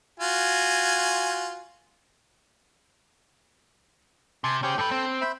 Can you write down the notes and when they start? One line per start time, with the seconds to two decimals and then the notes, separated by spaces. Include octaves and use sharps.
0.20 F4 F#4 G#5
4.44 C3 G#5 A5 C6
4.63 C#4 G4 G#4 C5 G5
4.78 G2 A4 B4 G5
4.91 C4
5.21 C5 E5 B5